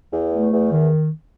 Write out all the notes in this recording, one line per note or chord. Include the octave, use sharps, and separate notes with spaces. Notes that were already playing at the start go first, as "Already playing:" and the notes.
E2
A3
E2
D#3